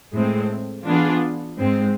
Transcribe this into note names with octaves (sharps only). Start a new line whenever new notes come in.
A2 G#3 C4
E3 B3 D4 F4 G#4
G#2 G#3 C4